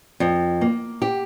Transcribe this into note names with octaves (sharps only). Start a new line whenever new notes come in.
F2
A#3
G4